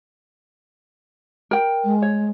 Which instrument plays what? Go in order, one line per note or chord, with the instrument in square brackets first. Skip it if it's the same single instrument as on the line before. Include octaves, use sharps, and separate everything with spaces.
[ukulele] A#4 G5
[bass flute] G#3
[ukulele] C#5